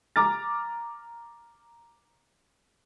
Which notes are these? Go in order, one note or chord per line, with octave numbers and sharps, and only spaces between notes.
A#5 D6 F6 A6